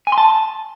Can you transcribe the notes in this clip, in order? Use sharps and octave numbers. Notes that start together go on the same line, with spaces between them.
G#5
C6
A5